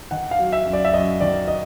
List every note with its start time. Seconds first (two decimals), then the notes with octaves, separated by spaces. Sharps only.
0.11 D#3 F#5
0.31 F5
0.39 F#3
0.52 E5
0.65 F#2
0.73 D5
0.85 E5
0.94 F#2 D#5
1.21 D#3 D5
1.48 D#5